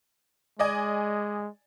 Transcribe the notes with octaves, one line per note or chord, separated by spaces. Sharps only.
G#3 D5 D#5 G#5